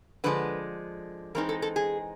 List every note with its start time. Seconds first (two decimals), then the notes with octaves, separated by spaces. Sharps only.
0.24 D3 F3 G#3 B4
1.35 E3 G#3 C4 D#4 A#4
1.49 A4
1.62 A4
1.76 G#4